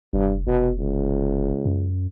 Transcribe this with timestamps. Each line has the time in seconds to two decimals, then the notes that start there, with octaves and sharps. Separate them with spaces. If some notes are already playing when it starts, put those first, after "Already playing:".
0.13 F1 G2
0.47 F1 B2
0.79 C#2
1.65 F#2